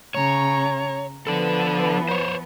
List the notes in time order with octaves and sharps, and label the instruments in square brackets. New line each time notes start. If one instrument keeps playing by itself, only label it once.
[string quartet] C#3 A#5 [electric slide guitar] C#5
[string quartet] F3 B3 B4 [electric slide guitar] D4 A4
[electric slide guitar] C5 C#5